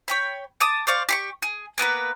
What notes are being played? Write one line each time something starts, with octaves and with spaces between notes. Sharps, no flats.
C#5 G5 B5
A5 D6 D#6
C5 D5 F5 C#6
G4 C6 C#6
G#4
A#3 B3 A#4 B4